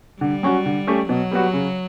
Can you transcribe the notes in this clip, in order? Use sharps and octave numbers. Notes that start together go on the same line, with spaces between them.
D3 G3
F#3 C#4 F#4
D3
A3 C#4 G4
B2 F#3
G3 B3 F#4
C#3